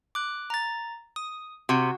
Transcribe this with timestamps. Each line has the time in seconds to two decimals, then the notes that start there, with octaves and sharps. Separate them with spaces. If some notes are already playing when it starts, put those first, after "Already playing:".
0.15 D6 F#6
0.50 A#5 A6
1.16 D#6
1.69 C3 F#4 F#5